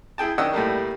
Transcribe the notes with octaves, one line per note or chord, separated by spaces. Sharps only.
E4 G#4 G5 A5
D#3 C#4 D4 D#5 F#5 E6
A2 G3 A3 A#3